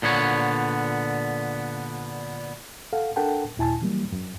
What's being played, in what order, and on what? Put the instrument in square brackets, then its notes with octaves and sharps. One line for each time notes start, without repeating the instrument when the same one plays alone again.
[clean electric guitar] A#2 D3 B3 C#5
[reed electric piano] A4 F5 F#5
D4 A4 A#4 F#5 G5 A5
D#2 A#2 E4 G#5 A5
E3 F#3 G3 A#3
F#2